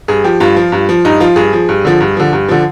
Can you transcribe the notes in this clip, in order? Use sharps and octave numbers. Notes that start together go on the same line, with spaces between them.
G2 G#4
F3 G4
G2 F4
F3
G2
F3
G2 D#4
F3 F4
G2 G#4
F3
G2
D3 F3
G2
D3 F3
G2
D3 F3